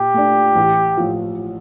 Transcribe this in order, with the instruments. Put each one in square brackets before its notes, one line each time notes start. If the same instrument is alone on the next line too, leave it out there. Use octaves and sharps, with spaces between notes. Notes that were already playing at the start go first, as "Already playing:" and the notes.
Already playing: [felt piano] A#2 [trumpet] G4
[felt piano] A3 D4
A1
A2 F3